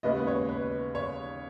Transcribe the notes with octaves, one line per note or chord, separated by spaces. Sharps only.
D#2 C#3 G#3 B3 B4 D#5
C#5
B4
C#5